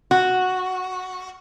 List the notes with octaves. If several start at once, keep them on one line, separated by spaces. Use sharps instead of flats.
F#4